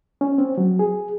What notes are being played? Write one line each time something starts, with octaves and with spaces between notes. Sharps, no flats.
C#4
C4
F#3
G#4